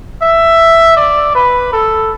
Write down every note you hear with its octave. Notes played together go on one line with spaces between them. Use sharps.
E5
D5
B4
A4